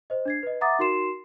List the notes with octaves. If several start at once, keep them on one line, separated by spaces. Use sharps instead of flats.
C5 D#5
D4 G#6 C7
B4 D#5
E5 F#5 A#5 D6 D#6 A6
D#4 F#4 A#4 C6 C7 E7